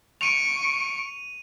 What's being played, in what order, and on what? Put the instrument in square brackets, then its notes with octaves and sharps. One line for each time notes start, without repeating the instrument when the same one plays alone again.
[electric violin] C#6 D7 [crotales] D#7 F7